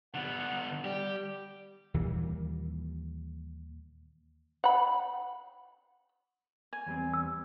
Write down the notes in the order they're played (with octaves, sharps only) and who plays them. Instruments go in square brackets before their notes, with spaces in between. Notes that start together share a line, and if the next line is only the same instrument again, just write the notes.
[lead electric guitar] D3 B3 [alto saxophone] F#5
[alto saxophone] G3 [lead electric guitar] G4
[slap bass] D#2 A#2 E3 G3
[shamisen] F#5 B5
[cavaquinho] G#5
[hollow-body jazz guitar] E2 G3 C4
[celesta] E6